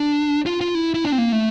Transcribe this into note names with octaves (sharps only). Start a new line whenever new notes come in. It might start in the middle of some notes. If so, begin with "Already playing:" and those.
Already playing: D4
F4
F4
E4
E4
D4
C4
A#3
A3